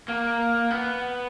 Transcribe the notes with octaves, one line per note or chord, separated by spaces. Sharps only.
A#3
B3